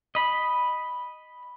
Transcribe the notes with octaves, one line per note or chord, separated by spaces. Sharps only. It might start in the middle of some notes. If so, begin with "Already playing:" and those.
D#5 B5